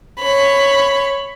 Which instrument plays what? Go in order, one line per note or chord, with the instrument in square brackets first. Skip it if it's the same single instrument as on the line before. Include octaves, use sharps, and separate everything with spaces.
[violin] C#5 B5